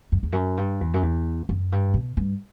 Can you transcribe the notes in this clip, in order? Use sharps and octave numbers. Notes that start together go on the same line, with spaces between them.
F#2
E2
F#2
G2
E2
F#2
E2
F#2
G2
B2
G2